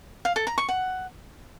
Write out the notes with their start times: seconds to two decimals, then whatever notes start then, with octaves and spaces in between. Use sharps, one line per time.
0.25 F5
0.36 A4
0.47 A#5
0.58 C#6
0.69 F#5